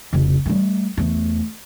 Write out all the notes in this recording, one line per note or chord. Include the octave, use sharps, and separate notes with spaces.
F1 C#2
G3 A3
E2 A3